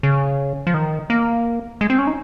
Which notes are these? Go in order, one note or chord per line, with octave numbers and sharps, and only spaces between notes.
C#3
F3
D#3
A#3
G#3
C4
C#4
D#4